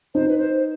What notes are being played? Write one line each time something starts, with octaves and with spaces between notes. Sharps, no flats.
D#4 C5
B4
C5